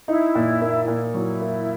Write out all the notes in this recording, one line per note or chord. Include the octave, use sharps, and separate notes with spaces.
D#4 E4
A#2
A#3
A#2
F#3 E4
A#3